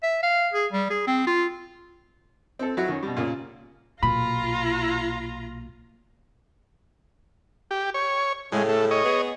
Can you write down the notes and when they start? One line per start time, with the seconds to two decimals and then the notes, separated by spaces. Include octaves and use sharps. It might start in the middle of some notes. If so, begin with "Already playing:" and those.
0.03 E5
0.23 F5
0.53 G#4
0.72 G3
0.90 G#4
1.07 C4
1.27 F4
2.59 C4 A4
2.77 F#3 E4 F#4
2.88 D#3 C#4
3.03 B2 G3
3.16 A#2 C#3 A#3
4.03 B1 A#2 F4 A#5 B5
7.71 G4
7.94 C#5
8.52 A2 C#3 G#3
8.69 A3
8.91 C#5 D#5
9.04 B3 G#4